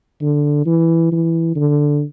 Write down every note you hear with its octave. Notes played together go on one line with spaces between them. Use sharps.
D3
E3
E3
D3